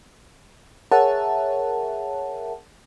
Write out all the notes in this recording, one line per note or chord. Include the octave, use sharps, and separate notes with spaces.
G#4 A#4 C#5 E5 F#5 A5